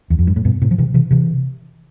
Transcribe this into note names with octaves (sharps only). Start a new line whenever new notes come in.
E2
F2
G2
A2
G2 B2
A2 C3
F3
C3 E3
C3 E3
C3 E3